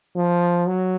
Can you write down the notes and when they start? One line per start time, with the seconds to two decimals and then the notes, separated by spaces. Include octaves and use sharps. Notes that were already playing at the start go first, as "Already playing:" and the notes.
0.15 F3
0.66 F#3